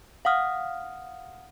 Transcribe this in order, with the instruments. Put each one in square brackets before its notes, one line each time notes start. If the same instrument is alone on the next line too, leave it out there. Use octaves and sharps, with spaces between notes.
[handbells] F5 F#5 D#6 F6